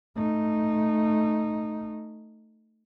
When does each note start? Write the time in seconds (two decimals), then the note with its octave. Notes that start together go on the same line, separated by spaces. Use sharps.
0.17 A3 D#4